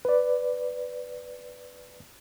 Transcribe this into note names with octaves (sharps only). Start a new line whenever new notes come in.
B4 D5